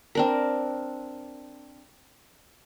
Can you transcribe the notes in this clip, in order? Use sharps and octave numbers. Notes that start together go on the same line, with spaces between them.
C4 D4 A#4